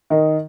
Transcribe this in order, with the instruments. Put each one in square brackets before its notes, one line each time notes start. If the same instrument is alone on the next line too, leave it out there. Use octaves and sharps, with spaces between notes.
[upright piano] D#3 D#4